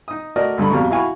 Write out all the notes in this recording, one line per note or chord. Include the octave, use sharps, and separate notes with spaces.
D#4 D#6
A3 F#4 A#4 D5 D#5
D2 G2 A4 B5
A#1 F2 B2 G3 A#5 C#6
E4 F#4 F5 G#5 B5 C#6